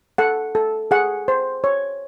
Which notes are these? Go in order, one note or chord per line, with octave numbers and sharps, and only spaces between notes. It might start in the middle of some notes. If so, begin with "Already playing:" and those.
A4 F#5
A4
G#4 F#5
C5
C#5